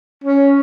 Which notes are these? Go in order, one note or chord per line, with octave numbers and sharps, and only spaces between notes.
C#4